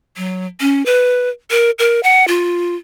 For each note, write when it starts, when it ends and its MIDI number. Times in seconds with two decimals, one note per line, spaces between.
0.17 0.46 54
0.60 0.84 61
0.86 1.29 71
1.51 1.71 70
1.79 2.00 70
2.03 2.25 78
2.28 2.75 65